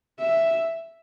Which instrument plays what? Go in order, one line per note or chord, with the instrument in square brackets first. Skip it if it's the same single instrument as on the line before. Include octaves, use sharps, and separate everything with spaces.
[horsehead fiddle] E5